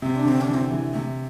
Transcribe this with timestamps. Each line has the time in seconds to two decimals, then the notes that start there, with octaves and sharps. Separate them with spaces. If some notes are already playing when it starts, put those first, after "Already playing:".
0.02 C3 C4
0.16 D4
0.25 D3 C4
0.41 D4
0.48 E3
0.54 C4
0.71 E3
0.93 C3 A3